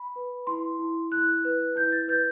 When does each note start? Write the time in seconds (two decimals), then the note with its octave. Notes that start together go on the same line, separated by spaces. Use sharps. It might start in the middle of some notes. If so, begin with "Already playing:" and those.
Already playing: B5
0.16 B4
0.47 E4 C6
0.79 E4
1.12 E4 F#6
1.45 B4
1.76 E4 G6
1.92 A6
2.08 B4 G6